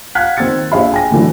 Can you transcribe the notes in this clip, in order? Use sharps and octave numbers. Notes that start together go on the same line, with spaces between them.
F5 F#5 F#6 G#6 B6
D#3 C4 E6 G#6 A6 C#7
A#1 G#4 C#5 E5 F5 B5
G5 G#5 A#6
A2 D3 E3 F#3